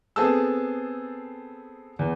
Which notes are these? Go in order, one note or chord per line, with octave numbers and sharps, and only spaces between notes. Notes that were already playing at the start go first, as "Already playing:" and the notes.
B3 C4 G#4 A4 A5 E6
E2